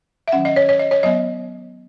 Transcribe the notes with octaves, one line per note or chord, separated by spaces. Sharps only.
E5
D#3 F#3 C#4 F#5
D#5
C#5
C#5
D#5
C#5
F#3 B3 D#5